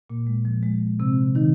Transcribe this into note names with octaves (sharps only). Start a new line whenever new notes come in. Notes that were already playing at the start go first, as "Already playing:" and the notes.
A#2 A#3
G#3
F3
G#3
C3 C4
D#3 D#4